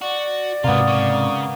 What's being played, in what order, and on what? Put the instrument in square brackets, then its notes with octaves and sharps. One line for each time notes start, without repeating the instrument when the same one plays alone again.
[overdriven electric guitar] F#4 [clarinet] D5
[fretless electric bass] G#2 C3 [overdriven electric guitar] F#3 F4 [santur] A#3 B3
[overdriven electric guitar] C#3